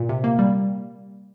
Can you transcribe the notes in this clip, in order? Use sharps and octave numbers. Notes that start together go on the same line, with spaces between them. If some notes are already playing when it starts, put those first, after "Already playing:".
Already playing: A#2
C3
A#3
G3